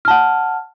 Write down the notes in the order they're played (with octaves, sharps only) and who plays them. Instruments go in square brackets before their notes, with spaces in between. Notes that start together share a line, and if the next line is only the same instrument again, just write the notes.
[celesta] F6
A5
F#5